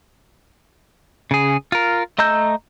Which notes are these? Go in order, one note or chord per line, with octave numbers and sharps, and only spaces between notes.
C#3 G#4
F4 A#4
A3 D#5 A#5 E6 G6